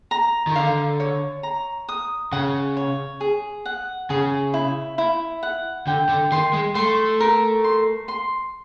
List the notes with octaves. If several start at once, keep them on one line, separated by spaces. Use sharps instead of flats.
A#5
D#3
D3 F5
C#5
A#5
D#6
C#3 F#5
C#5
G#4
F#5
C#3 G#4
E4
E4
F#5
D3 G5
D3
D#3 C6
G#3
A3 C6
A#4
C6
C6